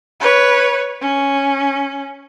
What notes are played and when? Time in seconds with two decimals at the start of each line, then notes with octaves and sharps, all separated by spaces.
0.20 B4 C#5
1.01 C#4